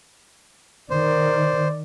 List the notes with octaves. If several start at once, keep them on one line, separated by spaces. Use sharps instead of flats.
D#3 C5 D5